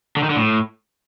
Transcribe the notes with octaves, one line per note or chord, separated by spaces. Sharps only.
D3
D#3
D3
A2